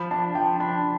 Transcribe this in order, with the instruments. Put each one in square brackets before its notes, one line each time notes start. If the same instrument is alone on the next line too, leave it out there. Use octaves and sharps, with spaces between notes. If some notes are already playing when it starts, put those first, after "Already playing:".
Already playing: [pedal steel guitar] F3 [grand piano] B5
[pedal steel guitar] D4 [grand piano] A5
[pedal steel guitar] F3 [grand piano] G5
[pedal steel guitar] D4 [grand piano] B5